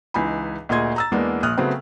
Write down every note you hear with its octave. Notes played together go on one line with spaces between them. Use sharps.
C#2 E3 D#4 G#5 B5
D2 A#2 G#4 D#5 C6 G#6
A#5 E6 A6
E2 G#3 A#3 B3 D4
A#1 D#6 F6 F#6
C#3 F#3 A3 B3 C4